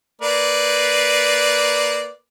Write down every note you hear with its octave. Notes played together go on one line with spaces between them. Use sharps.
A#3 B4 D5